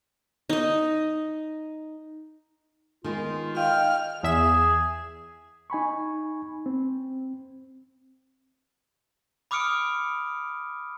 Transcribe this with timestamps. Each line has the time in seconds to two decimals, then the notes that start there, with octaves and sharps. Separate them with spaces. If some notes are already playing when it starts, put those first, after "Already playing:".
0.49 D#4 D#5
3.04 D#3 G#3 B3 F4
3.57 D#5 F5 G5 F6
4.23 E2 G#4 E5 E7
5.70 D#4 G#5 B5 C#6
6.66 C4
9.51 B5 D6 D#6 F6 C#7 D7